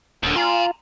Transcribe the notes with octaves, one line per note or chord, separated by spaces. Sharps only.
D#1 D#2 D3
F4 A#5 C6